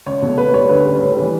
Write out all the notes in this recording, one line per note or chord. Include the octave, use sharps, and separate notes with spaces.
C#2 C#5
B2 F#3 A3
A2 B4
G3 C#5
D2 B4
C#3 G3
A2
E3 G3